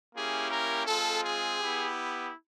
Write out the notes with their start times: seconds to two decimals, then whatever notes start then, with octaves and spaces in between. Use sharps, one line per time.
0.15 A#3 C#4 E4 G4 G#4
0.51 A#4
0.86 G#3 C4 F4 A4
1.22 G#4
1.59 B3 E4 G4